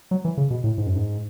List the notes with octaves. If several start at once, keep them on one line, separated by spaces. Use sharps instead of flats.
F#3
E3
C#3
B2
A2
G#2
F#2
G#2